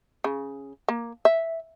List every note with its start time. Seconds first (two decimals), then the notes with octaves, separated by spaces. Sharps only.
0.24 C#3
0.88 A#3
1.25 E5